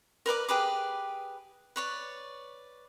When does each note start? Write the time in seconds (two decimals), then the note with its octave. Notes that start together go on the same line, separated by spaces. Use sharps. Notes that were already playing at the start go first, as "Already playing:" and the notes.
0.26 A#4 B4 D5 D6
0.49 G4 G#4 B4 D6
1.76 B4 C#5 D5